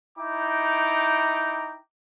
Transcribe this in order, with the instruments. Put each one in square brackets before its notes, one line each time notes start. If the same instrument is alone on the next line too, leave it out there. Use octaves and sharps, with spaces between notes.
[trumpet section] D#4 E4 G5 A#5 D6